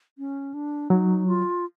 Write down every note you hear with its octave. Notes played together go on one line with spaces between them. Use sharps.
C#4
D4
F#3 D#4
F4